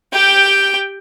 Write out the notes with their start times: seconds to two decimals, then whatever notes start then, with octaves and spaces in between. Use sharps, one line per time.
0.13 G4 G5